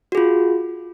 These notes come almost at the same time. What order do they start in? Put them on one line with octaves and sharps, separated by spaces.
F#4 G#4 F4